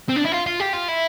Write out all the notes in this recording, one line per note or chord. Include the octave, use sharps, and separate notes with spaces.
C4
D4
E4
F4
F4
G4
F4
E4